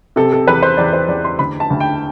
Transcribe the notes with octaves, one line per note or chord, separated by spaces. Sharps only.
C3 A4
A4
E2 B4
C5
E2 D5
C5
E2 D5
C6
D2 B5
A5
D2
G5